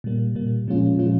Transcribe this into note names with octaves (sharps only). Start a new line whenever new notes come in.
A#2 G3 A#3
A#2 G3 A#3
A#2 F3 G#3 C#4 F4
A#2 F3 G#3 C#4 F4